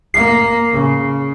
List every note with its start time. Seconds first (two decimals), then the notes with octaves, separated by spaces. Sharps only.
0.14 A#3 C7
0.72 C#3